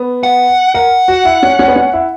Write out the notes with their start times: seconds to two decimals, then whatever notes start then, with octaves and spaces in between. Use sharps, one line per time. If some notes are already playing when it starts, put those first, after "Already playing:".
Already playing: B3
0.23 F#5
0.74 A#4 F#5
1.08 F#4
1.25 E4
1.43 C#4
1.59 C#4
1.68 B3
1.76 C#4
1.93 E4